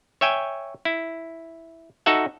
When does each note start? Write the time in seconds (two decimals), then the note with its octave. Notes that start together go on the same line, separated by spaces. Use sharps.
0.21 C#5 E5 G5 G#5
0.85 E4
2.06 D#4 F#4 A4 E5 F#5